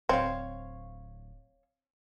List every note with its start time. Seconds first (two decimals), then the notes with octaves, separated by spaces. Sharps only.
0.09 D1 C4 C#5 F5